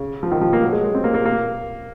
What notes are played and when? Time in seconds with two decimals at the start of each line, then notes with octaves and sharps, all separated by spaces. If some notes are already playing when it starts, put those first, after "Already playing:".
Already playing: C#3
0.23 F3
0.32 D#3
0.41 F3
0.53 A#3
0.63 F#3
0.73 G#3
0.84 G#3
0.95 C4
1.04 A#3
1.14 A#3
1.25 A#3